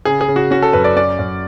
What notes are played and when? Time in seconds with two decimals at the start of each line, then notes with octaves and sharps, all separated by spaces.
0.05 C#3 G#4
0.21 G#4
0.28 C#3
0.36 F#4
0.51 C#4 F#4
0.62 A4
0.73 F#2 B4
0.84 D5
0.96 C#4 D5
1.19 F#2